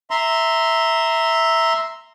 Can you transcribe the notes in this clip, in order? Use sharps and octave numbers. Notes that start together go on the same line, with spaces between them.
E5 A#5 C6